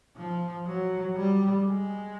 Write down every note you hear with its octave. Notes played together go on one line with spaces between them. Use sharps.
F3
F#3
G3
G#3